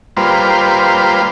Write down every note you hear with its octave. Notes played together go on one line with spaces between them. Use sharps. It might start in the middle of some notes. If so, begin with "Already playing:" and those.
G3 A#3 F4 B4 C5